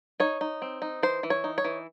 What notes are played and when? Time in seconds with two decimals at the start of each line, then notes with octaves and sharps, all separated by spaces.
0.20 D#4 C#5
0.41 D#4
0.62 C4
0.82 D#4
1.03 E3 C5
1.23 E3
1.30 C#5
1.44 D#4
1.58 C#5
1.64 E3